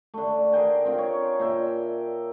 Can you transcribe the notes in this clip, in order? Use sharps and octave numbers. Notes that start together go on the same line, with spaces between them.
D3 A3
G#4 A#4 G5 G#5
C4 F4
C#5
A#2 A#4 E5 G5